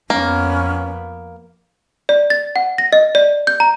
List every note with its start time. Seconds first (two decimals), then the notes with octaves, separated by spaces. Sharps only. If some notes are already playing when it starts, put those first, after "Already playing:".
0.10 F2 F3 A#3 B3 C#4
2.09 D5
2.30 A6
2.56 F#5
2.78 A#6
2.93 D#5
3.15 D5
3.47 G6
3.60 A#5